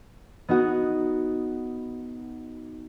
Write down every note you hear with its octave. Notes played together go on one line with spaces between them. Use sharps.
B3 D#4 F#4